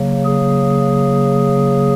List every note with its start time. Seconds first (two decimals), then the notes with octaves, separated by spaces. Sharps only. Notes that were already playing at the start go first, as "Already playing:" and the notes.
Already playing: C#3 F#3 A#3
0.26 G#4